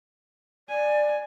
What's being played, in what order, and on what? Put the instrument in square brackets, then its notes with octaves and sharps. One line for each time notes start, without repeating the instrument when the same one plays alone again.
[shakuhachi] D5 [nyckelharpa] G#5